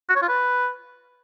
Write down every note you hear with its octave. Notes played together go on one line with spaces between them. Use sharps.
F#4
C#5
F4
B4